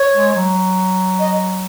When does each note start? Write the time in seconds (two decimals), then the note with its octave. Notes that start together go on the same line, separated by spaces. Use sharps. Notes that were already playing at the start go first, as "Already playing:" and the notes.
Already playing: C#5
0.15 G#3
0.35 F#3
1.19 D#5